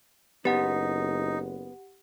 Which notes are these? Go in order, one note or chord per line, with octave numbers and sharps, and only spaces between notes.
F#1 B3 D#4 G4 F#5